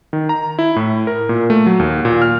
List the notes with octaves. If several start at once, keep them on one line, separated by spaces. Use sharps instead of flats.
D#3
A#5
E4
A2
A#4
A#2
A3
F#3
D#2
A#2
F6